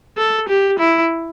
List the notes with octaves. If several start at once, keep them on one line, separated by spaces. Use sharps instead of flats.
A4
G4
E4